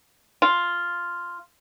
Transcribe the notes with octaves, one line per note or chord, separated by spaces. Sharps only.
F4